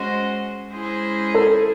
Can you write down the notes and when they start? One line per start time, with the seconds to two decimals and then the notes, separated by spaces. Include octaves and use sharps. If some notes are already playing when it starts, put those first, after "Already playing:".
Already playing: G#3 C#4 F#4 C5 D#5
0.71 G#3 C#4 E4 G#4 C5
1.35 A4